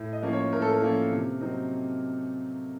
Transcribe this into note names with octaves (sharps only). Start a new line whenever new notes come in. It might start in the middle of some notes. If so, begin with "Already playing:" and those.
Already playing: A2
D#5
F3 A#3 C#4
C#5
A2 A#4
A4
A#4
F3 A#3 C#4
C3
F#3 C4 D#4